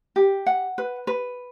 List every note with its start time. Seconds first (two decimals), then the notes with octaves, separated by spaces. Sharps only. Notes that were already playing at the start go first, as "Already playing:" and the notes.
0.16 G4
0.46 F#5
0.78 B4
1.07 B4